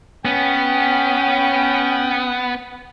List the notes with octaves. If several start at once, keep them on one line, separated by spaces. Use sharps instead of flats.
B3 C#4 G5